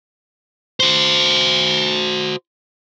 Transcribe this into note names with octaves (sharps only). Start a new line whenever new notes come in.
F#4 C5